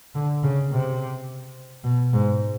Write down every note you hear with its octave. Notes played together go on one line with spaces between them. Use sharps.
D3
C#3
C3
B2
G#2